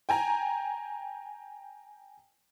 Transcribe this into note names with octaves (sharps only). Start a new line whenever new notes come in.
G5 G#5 A#5